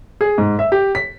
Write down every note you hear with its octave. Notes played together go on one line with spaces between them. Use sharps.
G#4
G#2
E5
G4
B6